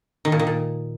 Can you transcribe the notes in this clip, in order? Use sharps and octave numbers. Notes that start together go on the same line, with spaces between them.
D#3
A#2
D#3
A#2